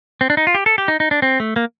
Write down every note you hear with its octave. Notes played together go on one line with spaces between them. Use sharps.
C4
D4
D#4
F4
G4
A4
G4
D#4
D#4
D4
C4
A3
A#3